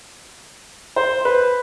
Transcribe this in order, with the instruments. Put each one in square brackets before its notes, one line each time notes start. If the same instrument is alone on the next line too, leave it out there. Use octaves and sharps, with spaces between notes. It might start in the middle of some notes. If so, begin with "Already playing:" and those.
[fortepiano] C5
B4